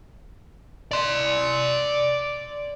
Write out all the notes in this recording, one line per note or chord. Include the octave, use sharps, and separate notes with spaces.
D5 C6